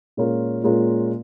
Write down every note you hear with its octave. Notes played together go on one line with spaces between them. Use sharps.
A#2 G#3 C#4 F4 A#4
A#2 G#3 C#4 F4 A#4